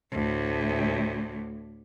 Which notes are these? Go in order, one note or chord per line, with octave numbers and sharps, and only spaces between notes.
D2 A2